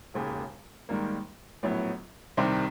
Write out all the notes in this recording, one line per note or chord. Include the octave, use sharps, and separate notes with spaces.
E1 D#2 C#3
G#2 D#3 G3 A#3
A#1 A2 F#3 B3
C2 C3 D#3 G3 C4